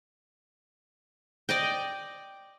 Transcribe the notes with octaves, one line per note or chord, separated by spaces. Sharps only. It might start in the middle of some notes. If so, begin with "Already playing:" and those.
D5 D#5 G5